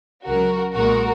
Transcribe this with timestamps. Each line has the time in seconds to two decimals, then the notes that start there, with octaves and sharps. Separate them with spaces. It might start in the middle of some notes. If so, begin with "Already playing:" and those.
0.25 C#2 C#3 F#3 F#4 A#4
0.74 B1 A#2 G#3 F#4 A#4